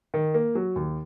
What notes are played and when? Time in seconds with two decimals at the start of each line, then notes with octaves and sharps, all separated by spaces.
0.14 D#3
0.34 A#3
0.55 F#3
0.76 D#2